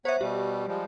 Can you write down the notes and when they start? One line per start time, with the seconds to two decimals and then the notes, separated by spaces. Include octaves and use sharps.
0.05 B3 C5 C#5 E5 F#5
0.21 B2 G3 G4
0.68 F3 G3 G#3